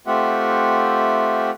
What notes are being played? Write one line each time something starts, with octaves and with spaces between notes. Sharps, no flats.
A3 C4 F4 G4 E5 F#5